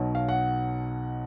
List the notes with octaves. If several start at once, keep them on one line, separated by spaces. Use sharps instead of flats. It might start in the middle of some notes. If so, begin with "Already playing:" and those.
Already playing: B1 B2 F#3
F5
F#5